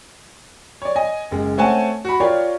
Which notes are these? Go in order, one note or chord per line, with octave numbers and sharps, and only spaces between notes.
C#5 D5
D#5 G#5
F#1 G#3
A3 C4 C#5 F#5 G#5 A5
F#4 B5
F4 G4 A#4 C#5 D5